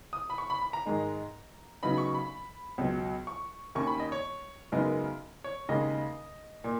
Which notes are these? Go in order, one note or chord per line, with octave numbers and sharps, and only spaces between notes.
D#6
B5
C#6
B5
B5
A#5
G#2 D#3 G#3 D#4
C#3 F#3 B3 D#4 B5
C#6
B5
C#2 B2 F#3
C#6
D#2 D#3 A#3 C#4 C#6
B5
D#5
C#5
F#2 C#3 G#3 B3 D#4 A#4
C#5
D#2 C#3 G#3 D#4 D#5
A#2